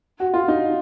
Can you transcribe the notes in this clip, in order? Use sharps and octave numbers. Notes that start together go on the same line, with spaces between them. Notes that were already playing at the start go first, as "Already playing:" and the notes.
F#4
F4
D#4